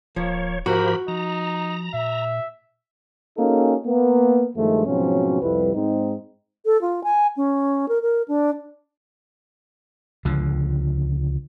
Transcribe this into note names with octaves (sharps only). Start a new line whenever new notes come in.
D1 F3 A#3 C#5
G#2 F3 F#4 G4 A#4 B5
F3 D#4 A#5
A#2 E5
A#3 C#4 D#4 F#4 G#4 A4
A#3 B3
G2 D#3 F3 G#3 A3
G#2 B2 F3 F#3 C4 C#4
C2 F2 G3 E4 B4
G#2 G#3 C4 D#4
A4
F4
G#5
C#4
A#4
A#4
D4
C#2 D3 F3